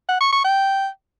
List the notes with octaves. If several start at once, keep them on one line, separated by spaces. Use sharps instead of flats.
F#5
C#6
C#6
G5